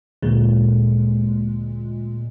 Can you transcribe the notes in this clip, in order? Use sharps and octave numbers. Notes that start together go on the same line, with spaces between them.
D2 A#2 G#3